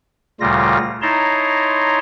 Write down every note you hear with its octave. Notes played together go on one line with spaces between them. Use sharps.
D2 A#2 C#3 G3 F4 A#6
D#4 E4 C#5 A5 A#5 C6